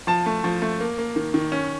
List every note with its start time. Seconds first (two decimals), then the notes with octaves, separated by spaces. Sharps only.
0.07 F3 A5
0.26 A3
0.44 F3
0.62 A3
0.80 A#3
0.98 A#3
1.16 D#3
1.34 D#3
1.52 C#4